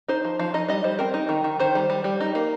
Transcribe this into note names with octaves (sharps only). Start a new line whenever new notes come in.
D#4 C5
F3
F3 F5
D#4 D#5
G3 D#5
G3 C5
C4 A#4
D#4
D#3
D#3
D#3 C5
G3
G3
G3
D#4
A#3